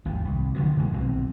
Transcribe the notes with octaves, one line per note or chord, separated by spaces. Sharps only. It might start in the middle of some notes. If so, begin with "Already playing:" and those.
G#1 D#2 D#3 F3
C2
D3 D#3 F3 F#3
A#2 D#3 G#3 A#3
B1 B2 C4